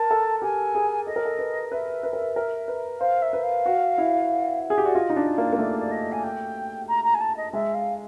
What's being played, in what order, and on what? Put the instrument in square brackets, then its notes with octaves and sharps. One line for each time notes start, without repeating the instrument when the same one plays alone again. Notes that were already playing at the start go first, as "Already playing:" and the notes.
Already playing: [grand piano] A#4 [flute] A5
[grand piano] A4
[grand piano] G4 [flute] G#5
[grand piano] G#4
[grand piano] A4 [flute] D#5
[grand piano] A#4
A4
B4
[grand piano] B4 [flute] E5
[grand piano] B4
A#4
B4
A#4
B4
[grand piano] C5 [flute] F5
[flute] E5
[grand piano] B4
[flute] F5
[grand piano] F#4
E4
G#4
G4
[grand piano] F#4 [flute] D5
[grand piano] F4 [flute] D#5
[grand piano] D#4
D4
[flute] D5
[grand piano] A#3
A#3
[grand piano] A3 [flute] D5
[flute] D5
D#5
G#5
G5
A#5
A#5
G#5
A5
D#5
[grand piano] G#3 [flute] E5
[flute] F5